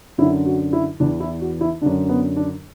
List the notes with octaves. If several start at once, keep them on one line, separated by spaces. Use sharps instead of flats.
F#2 D3 E4
F#4
E4
E2 E3 D4
E4
F#4
E4
F#2 D3 D4
B3
D4